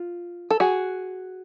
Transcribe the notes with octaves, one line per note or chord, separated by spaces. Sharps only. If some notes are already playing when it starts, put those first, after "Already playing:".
Already playing: F4
A4
F#4 G#4